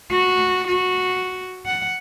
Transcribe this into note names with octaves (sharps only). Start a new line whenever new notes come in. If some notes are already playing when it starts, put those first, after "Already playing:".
F#4
F#4
F#5